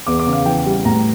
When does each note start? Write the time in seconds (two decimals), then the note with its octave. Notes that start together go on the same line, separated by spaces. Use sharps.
0.07 E2 D6
0.19 D6
0.26 C#3
0.33 F5
0.46 E3 G5
0.66 G3
0.85 A2 A#5